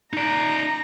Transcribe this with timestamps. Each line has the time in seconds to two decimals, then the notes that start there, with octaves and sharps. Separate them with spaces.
0.13 D#4 D5 A#5